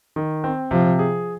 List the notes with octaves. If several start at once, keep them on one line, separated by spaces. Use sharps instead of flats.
D#3
C4
C3 F3
G#4